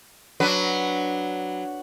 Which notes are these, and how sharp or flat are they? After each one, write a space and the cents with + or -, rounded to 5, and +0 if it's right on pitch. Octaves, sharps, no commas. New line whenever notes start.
F#3 +0 D4 +0 B4 +0